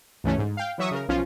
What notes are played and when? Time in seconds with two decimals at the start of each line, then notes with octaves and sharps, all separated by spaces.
0.24 C#2 G2 E3 A3 C#4
0.38 G#2
0.57 F5 G5
0.78 E3 F#3 E5 C#6 D#6
0.91 C#3 A#4
1.08 B1 F3 C#4 F4